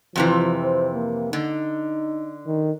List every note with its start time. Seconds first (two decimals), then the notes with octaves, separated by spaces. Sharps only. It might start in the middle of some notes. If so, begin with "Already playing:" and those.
0.16 F2 C3 E3 F3
0.64 C5
0.93 A#3
1.33 D3 D#4
2.46 D#3